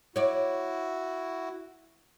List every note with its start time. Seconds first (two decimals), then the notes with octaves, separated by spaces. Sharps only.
0.16 E4 F#4 C#5 D5